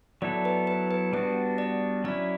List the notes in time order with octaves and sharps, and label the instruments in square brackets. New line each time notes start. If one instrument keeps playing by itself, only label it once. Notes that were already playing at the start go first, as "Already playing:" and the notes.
[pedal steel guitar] F#3 B3 E4 A4 [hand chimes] D5
[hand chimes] B4
B4
B4
[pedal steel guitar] G3 B3 D4 F#4 [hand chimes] B4
[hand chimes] D5
[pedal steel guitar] F#3 C#4 E4 [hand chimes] D5